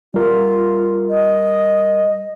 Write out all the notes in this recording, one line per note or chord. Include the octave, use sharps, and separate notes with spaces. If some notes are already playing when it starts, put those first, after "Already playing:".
G3 F4 A#4
D#5